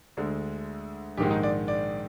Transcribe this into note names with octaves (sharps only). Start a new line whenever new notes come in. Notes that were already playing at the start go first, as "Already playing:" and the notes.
D2 D3 G#3
A#1 G#2 D#3 G#3 G4
D#4
D5
D5